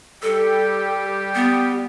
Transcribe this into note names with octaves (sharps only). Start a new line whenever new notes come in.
G3 G4 A4
B3